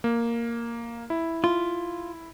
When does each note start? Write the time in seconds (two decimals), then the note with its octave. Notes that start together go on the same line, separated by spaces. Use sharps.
0.04 A#3
1.10 E4
1.44 F4